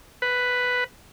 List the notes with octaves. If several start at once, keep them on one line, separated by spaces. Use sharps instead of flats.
B4